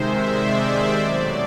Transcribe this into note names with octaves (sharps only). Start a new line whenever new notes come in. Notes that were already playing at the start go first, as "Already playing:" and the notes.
Already playing: C3 D#3 G#3 C5 E5
D5
B2 F#3 A3 D5